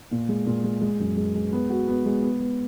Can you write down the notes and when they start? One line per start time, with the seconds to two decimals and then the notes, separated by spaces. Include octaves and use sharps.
0.11 A#2
0.29 G#3
0.46 A#2
0.64 G#3
0.81 G#3
1.00 F#2
1.17 G#3
1.35 G#3
1.52 B3
1.70 F#4
1.87 B3
2.05 G#3
2.22 B3
2.40 B3